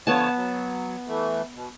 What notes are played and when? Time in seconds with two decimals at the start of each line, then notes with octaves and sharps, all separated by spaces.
0.07 D3 F3 B3 C#5 A5
0.36 F#3
1.08 E3 A3
1.55 B2